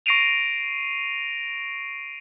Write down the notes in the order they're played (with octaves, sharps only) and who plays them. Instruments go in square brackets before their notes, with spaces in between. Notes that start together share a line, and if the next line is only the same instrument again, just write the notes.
[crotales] C#6 A#6 C7 D7 D#7 F7